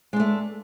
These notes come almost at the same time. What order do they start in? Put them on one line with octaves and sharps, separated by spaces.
G#3 D4 A3